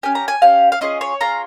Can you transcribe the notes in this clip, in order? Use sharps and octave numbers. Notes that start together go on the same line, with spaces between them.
C#4 G4 G#5
A#5
G#5
C#4 G4 F5
F5
C#4 F4 G#4 D#5
C#5
C#4 F4 G#4 A#5